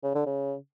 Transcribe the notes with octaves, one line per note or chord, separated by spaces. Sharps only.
C#3
D3
C#3